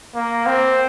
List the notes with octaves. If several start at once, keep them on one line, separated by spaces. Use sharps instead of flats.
A#3
C4